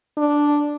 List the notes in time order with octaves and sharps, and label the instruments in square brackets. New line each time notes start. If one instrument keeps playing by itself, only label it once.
[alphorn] D4